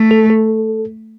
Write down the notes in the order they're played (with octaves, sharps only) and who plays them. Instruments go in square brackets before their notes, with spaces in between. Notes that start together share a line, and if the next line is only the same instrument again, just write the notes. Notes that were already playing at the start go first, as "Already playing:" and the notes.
Already playing: [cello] A3
[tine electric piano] A4
A4